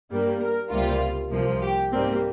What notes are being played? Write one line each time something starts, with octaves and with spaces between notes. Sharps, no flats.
G2 G3 A#3
A#4
C#2 C3 G3 A#3 F4
C2 C3 F3 A#3
G4
G#2 G3 A#3 C4